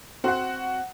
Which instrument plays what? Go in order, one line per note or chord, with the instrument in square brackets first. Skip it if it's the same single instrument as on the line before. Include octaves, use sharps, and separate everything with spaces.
[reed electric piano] C4 [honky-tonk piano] F#4 F#5